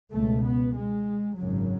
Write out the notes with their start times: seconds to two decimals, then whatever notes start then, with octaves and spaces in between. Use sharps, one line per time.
0.12 C#2 B2 A3
0.44 B3
0.75 G#3
1.37 G#1 F#2 C#3 F#3